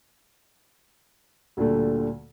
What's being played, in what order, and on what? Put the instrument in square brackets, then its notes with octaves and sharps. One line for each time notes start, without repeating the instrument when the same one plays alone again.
[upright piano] D2 A#2 D3 G3 A3